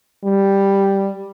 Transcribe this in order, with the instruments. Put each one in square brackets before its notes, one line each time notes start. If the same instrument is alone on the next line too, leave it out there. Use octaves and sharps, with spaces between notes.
[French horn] G3